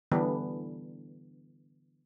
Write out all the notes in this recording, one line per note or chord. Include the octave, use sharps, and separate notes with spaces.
D3 E3 G3 B3 D4